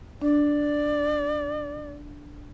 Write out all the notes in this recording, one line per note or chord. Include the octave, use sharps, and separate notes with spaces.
D4 D5